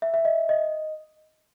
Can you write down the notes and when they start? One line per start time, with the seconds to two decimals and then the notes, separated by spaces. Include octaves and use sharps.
0.02 E5
0.14 E5
0.25 D#5
0.49 D#5